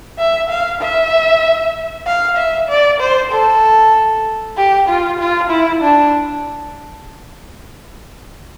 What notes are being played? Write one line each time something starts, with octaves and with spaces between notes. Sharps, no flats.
E5
F5
E5
F5
E5
D5
C5
A4
G4
F4
F4
E4
D4